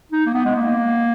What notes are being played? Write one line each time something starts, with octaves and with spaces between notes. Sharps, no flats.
D#4
A#3
B3
G#3
A#3